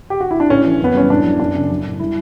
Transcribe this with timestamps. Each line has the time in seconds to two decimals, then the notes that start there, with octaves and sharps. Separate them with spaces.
0.10 G4
0.20 F#4
0.31 E4
0.40 D4
0.50 A2 C#4
0.65 E3
0.80 F#2 B3
0.94 G3 C#4
1.10 A2 D4
1.25 F#3
1.40 F#2 D4
1.55 C#3
1.70 F#3
1.85 A2
1.99 G3 E4